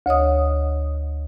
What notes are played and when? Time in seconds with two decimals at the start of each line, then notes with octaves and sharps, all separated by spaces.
0.06 D2 C#5 D#5 D#6